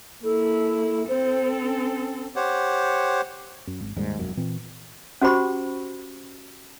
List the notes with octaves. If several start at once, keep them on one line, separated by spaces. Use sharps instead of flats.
A#3 E4 A4
C4 A4 C5
C#4
G4 C5 C#5 F#5
F#2
G#1
D#1 D#2 G#2 G3
E1 B1 F#2
A#2 E3 C4
C#4 F#4 G4 C5 B5 C#6